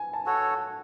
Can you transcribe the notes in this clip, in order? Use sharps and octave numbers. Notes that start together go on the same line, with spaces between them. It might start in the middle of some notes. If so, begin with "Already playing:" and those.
Already playing: G#5
A5
F#4 A4 C#5